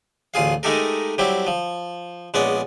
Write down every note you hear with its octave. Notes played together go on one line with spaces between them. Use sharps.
A1 D2 F4 G#4 F5
G#3 A3 D#4 G4 A4 A#4
F#3 G3 C4 E4 G4
F3
A#1 G#3 B3 C#4 D5 F#5